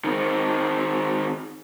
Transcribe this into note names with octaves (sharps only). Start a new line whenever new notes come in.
D#3 C4